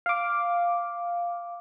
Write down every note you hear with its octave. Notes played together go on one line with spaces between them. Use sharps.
F5 D6